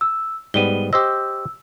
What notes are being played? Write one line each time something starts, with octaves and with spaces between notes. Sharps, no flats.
E6
G#2 G3 B3 D#7 G7
G4 C5 D#5 E6